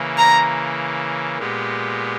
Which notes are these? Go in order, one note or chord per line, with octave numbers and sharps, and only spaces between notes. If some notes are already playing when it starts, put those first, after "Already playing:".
Already playing: C#3 E3 A#3
A#5
A#2 G#3 B3 G4